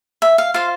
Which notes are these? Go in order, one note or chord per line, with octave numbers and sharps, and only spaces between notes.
E5
F5
F4 C5 F5